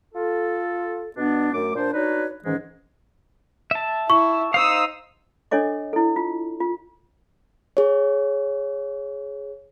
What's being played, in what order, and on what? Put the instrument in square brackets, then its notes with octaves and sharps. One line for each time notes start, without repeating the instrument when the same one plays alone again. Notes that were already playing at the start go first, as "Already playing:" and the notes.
[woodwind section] F4 A4
B2 B3 D4
F#2 A3 D6
A#2 D4 C5
D4 D#4 F#4 B4 C#5
G#2 D#3 E3 G#3 C#4
[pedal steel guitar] E5 A5
[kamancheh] E4 [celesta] C#6
[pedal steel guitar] D#4 C5 F5 [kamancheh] D#6 E6
[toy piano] D4 A4 C#5 D#5 D6
E4 A4
F4
F4
[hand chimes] G#4 C#5